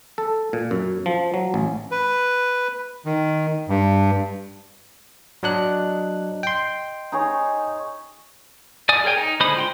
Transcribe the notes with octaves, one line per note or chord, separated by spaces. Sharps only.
A4
A#2
F#2
F3
F#3
A1
B4
D#3
G2
F#3 D4 D#5 F#6
G5 C6
D#4 G#4 C#5
D5 G#5 D#6
G#4 A#4 C#5 G5 G#5
D#4
D3 G#3 C5 B5 D#6
F4 G5 C6